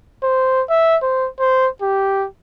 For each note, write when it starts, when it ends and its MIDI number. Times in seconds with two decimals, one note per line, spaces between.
0.23 0.62 72
0.70 0.96 76
1.03 1.28 72
1.40 1.68 72
1.82 2.27 67